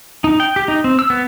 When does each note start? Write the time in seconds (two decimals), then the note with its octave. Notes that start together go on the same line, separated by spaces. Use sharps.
0.24 D#4
0.40 G5
0.56 G4
0.68 D#4
0.84 C4
0.99 E6
1.10 B3